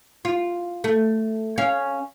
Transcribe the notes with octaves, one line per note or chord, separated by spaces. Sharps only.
F4
A3
C#4 F5